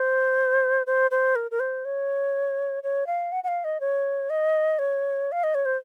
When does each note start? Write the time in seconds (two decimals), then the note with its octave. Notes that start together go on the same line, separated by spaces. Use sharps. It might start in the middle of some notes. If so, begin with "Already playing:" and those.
Already playing: C5
0.87 C5
1.11 C5
1.36 A#4
1.51 A#4
1.60 C5
1.85 C#5
2.83 C#5
3.07 F5
3.32 F#5
3.44 F#5
3.48 F5
3.64 D#5
3.80 C#5
4.30 D#5
4.79 C#5
5.32 F5
5.44 D#5
5.55 C#5
5.65 C5